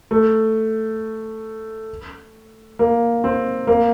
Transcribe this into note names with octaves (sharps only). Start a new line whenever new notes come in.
A3
A#3
C4
A#3